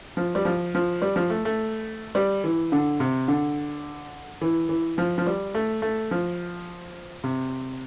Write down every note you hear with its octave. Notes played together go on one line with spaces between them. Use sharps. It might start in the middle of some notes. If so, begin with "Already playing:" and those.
F3
G3
F3
F3
G3
F3
A3
A3
G3
E3
D3
C3
D3
E3
E3
F3
F3
G3
A3
A3
F3
C3